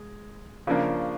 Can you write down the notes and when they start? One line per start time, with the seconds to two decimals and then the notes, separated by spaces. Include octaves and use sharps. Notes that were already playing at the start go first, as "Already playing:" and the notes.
Already playing: G#3
0.67 C#3 F3 A#3 D4